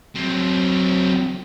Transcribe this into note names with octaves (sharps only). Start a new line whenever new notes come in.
F#3 C4